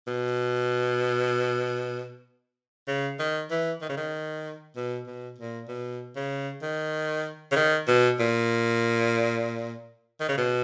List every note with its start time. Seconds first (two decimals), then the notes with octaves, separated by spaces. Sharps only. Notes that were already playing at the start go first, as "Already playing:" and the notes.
0.07 B2
2.87 C#3
3.19 D#3
3.50 E3
3.81 D#3
3.89 C#3
3.97 D#3
4.76 B2
5.06 B2
5.38 A#2
5.68 B2
6.16 C#3
6.62 D#3
7.51 C#3
7.56 D#3
7.87 B2
8.19 A#2
10.20 D#3
10.28 C#3
10.38 B2